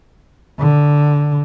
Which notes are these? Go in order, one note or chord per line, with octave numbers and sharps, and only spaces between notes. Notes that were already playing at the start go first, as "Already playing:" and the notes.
D3